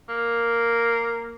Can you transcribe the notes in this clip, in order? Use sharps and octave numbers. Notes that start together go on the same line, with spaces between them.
A#3